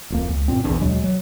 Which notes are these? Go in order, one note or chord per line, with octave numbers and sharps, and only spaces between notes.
D1 F2 A#3
C#2
F#2 A#2 C4
A#1 E2 A#2 D4
D#2 B2 F#3 G#3
F#3